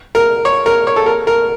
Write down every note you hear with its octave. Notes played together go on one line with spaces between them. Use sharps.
A#4
C#5
A#4
C#5
A4
A#4
A#4